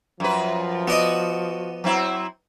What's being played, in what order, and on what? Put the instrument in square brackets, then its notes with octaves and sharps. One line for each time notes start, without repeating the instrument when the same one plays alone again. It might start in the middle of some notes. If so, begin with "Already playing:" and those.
[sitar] F#2 B4 [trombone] F3
[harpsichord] B3 D5 D#5 [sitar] F#4
[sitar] F#3 C4 E4